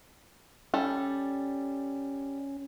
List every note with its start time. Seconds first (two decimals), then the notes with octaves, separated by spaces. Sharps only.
0.74 G3 C#4 A4